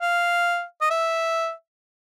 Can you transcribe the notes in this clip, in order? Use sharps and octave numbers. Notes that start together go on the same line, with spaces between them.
F5
D#5
E5